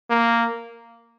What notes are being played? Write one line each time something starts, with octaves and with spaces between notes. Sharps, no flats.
A#3